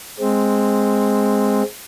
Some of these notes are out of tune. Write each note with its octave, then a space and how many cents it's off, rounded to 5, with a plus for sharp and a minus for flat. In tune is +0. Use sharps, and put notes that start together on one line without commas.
G#3 +0 C4 +0